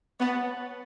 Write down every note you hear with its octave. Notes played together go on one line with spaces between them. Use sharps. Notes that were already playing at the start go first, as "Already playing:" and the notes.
B3 C#5 F#5 A5